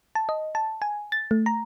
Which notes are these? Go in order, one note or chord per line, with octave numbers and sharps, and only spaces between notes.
A5
D#5
A5
G#5
A6
A3
A#5